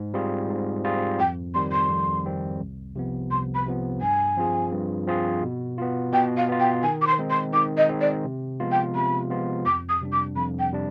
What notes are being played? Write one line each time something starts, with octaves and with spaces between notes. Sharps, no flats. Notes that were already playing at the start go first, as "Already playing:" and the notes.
Already playing: G#2
G3 C4 F4 G#4
G#2
G3 C4 F4 G#4
F2 G5
D#3 G3 C4 C6
C6
F2
D#3 G3 C4
C2
C3 F3 B3
C2 C6
B5
C3 F3 B3
G2 G#5
F3 C4 F4 G#4
G2
F3 C4 F4 G#4
B2
B3 F4
B2 G5
F5
B3 F4
G5
D#3 G#5
D6
C6
G#3 C4 D#4
C6
D#3 D6
D#5
G#3 C4 D#4
D5
C3
F3 G#3 B3 F4
G5
C3 B5
F3 G#3 B3 F4
F2 D6
D#6
C3 G3 D4
D6
F2 B5
G5
C3 G3 D4